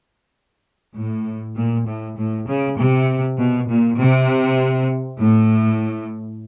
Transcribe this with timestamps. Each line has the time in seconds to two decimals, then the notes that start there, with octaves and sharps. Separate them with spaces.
0.95 A2
1.55 A#2
1.86 A2
2.17 A2
2.47 C#3
2.77 C3
3.37 B2
3.69 A#2
3.99 C3
5.20 A2